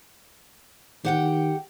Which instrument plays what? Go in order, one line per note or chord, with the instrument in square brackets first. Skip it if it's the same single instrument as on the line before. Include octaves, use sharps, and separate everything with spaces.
[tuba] D#3 [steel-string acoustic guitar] G4 F#5 G5